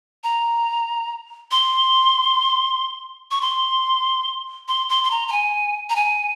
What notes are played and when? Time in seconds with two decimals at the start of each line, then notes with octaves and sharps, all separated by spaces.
0.24 A#5
1.51 C6
3.31 C#6
3.41 C6
4.68 C6
4.89 C6
5.04 C6
5.11 A#5
5.28 A#5
5.32 G#5
5.90 A#5
5.96 G#5